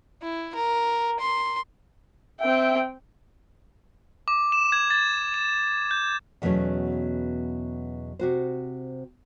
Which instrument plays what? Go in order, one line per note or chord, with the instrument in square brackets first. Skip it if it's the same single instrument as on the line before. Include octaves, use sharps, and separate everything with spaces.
[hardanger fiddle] E4
A#4
C6
[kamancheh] C4 G5 [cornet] E5
[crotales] D6
E7
G#6
A6
E7
G6
[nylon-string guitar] E2 B2 F#3 A3 C#4
C3 F#4 C5